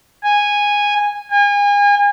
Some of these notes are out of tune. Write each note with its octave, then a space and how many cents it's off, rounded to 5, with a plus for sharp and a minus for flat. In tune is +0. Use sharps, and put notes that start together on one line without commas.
G#5 -10
G#5 -35